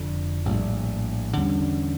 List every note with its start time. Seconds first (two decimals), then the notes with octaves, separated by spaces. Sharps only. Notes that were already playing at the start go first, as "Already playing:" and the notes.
Already playing: F1 F2 D3
0.45 A#1 A2 G3
1.37 E2 D3 G3 C#4